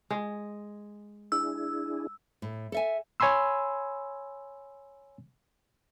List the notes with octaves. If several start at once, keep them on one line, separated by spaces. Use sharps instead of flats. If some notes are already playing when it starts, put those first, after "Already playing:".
G#3
D4 E4 G#4 E6
A2
A4 E5 G#5
C#5 G#5 B5 C6 E6